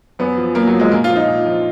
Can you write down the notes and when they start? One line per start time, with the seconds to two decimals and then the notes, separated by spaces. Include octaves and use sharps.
0.19 F#2 B3
0.37 F3
0.55 F#2 A#3
0.67 F#3
0.74 F3
0.80 G#3
0.91 A#2 A#3
1.04 F4
1.10 F3
1.16 D#4
1.28 A#2
1.46 F3